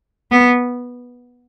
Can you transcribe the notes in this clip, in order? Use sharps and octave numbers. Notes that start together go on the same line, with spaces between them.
B3